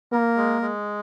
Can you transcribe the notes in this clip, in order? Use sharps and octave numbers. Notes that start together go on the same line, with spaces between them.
A#3 A#4
G#3
G#3